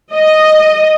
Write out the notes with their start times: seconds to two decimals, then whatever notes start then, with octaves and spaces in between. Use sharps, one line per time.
0.13 D#5